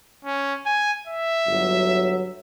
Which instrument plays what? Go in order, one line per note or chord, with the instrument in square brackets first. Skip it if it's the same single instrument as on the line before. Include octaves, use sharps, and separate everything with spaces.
[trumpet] C#4
G#5
E5
[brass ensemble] G1 F#3